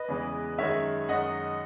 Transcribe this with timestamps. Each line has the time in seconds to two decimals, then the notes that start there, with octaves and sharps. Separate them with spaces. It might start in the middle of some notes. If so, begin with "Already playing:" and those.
Already playing: B4 D#5
0.08 E2 C#3 E3 G#3
0.58 F#2 D#3 G#3 C#5 E5
1.08 F#2 D#3 G#3 D#5 F#5